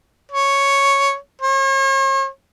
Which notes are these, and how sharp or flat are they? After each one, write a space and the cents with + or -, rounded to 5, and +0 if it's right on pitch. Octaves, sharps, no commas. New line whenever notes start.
C#5 +0
C#5 -45